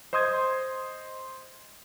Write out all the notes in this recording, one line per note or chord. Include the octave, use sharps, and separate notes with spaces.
C5 D#5 C6 D#6 G6 G#6